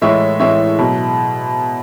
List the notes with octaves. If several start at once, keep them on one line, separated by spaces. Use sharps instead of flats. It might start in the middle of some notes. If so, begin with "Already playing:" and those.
A2 E3 G#3 C#5 E5
A2 E3 G#3 C#5 E5
B2 F#3